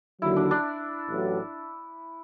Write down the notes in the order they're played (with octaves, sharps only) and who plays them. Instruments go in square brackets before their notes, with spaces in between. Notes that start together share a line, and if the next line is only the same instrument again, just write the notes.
[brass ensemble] D#2 D3 F#3 [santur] E4
[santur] D4
D4
[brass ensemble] A1 A2 F#3